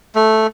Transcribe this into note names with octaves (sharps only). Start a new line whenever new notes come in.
A3